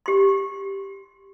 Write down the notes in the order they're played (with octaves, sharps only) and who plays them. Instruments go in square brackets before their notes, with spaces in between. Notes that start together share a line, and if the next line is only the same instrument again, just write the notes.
[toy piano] G4 C6